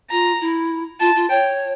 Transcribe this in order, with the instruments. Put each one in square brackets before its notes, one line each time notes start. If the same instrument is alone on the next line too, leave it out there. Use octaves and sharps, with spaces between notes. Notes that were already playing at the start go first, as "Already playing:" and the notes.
[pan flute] F4 [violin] A#5
[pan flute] E4
[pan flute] F4 [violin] A5
[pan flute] F4
[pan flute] C#5 [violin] G5